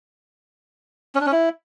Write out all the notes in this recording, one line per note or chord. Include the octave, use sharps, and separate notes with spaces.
C#4
D4
C#4
E4